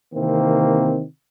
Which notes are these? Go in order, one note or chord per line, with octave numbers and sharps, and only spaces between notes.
C3 D#3 E3 A#3 C4